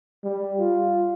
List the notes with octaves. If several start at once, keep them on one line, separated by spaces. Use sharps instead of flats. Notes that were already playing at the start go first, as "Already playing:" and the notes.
G3
F4